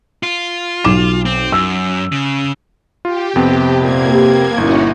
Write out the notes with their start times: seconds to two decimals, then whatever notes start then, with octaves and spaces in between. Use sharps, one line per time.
0.23 F4
0.84 B1 D6 E7
1.26 C4
1.52 F#2 E6
2.12 C#3
3.05 F4 G4
3.36 F2 C3 B3 C4
3.80 A#2 A#3 G#6
4.11 G4
4.58 G1 A#2 A#3 C#4 D#4 E4 F#4